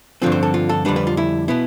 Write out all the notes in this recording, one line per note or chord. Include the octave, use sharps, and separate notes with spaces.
G2 D3 F3 C4 F4
C5
A4
F4
A4
F2 D3 G3 D4 B4
B4
F4
E4
B2 B3 E4